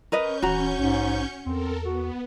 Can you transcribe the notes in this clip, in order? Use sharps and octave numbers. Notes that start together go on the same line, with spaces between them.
C#4 A#4 B4 D#5 C#6 G6
D#1 E3 F#4 A#5
A#1 G#2
E2 C4 A4 A#4
B3 F#4